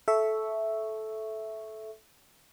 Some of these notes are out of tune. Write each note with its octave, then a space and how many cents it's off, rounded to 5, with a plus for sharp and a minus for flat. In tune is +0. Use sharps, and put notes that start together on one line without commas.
A4 -15 E5 +0 C#6 +0